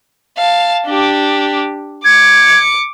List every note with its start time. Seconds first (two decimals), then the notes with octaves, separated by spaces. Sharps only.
0.38 F5 A5
0.86 D4 G4
2.05 D6 G#6 C#7